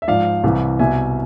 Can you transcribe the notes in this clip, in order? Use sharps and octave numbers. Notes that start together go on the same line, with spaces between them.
E5
G#2 F3 D5 F5
C2 C3 E3
C2 B2 E5 G#5